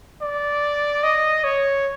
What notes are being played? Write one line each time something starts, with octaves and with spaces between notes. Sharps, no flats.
D5
D#5
C#5